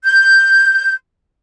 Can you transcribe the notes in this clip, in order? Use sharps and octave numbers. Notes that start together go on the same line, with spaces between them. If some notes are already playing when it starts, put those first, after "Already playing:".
G6